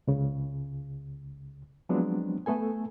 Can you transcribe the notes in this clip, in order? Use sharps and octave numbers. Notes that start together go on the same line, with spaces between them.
C#2 C#3
F3 F#3 G#3 B3 C4 D4
A3 B3 A4 G#5